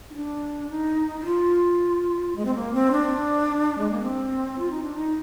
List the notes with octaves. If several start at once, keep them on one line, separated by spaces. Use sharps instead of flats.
D#4
D4
D#4
D#4
F4
G#3
C4
A#3
C4
D4
G#3
A#3
C4
F4
D#4
D4
D#4